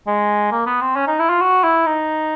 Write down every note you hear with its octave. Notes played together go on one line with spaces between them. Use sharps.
G#3
A#3
B3
C4
C#4
D#4
E4
F4
F#4
E4
D#4